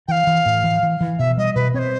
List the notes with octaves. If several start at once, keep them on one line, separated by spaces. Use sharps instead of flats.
E3 F5 G5
E3
A2
E3
E3
E3
B2 E5
G3 D#5
B2 B4
C4 C5 C#5